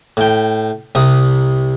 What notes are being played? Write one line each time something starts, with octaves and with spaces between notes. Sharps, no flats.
A2 G5
C2 C3 D#6